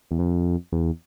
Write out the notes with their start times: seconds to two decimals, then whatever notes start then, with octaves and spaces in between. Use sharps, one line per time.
0.11 E2
0.19 F2
0.72 E2